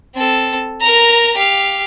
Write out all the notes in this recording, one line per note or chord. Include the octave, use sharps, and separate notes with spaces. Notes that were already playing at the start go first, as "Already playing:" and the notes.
C4 A4
A#4 A#5
G4 F5